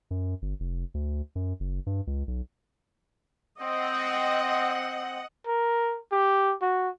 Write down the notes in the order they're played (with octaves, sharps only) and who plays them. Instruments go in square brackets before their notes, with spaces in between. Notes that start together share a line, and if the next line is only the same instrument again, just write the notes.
[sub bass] F#2
G1
F1
D2
F#2
F#1
G2
C#2
B1
[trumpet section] C4 [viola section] D#5 [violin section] F#5
[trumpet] A#4
G4
F#4